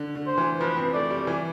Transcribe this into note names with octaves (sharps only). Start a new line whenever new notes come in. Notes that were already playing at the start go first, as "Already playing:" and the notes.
Already playing: D3
D3
C5
E3
F3 B4
C4
A3 D5
G3
E3